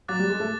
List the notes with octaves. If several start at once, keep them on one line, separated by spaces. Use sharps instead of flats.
F#3 D6 F#6 A6
G3
G#3
A3